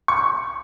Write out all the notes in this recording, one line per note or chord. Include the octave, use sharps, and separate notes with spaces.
C#6